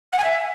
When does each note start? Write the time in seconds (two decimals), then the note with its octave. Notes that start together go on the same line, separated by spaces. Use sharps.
0.12 F#5
0.18 G#5
0.24 E5